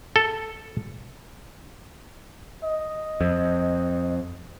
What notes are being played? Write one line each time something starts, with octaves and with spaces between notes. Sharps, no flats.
A4
D#5
F2